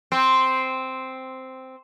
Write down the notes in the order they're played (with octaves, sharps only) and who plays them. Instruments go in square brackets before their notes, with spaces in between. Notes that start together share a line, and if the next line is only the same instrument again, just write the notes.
[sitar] C4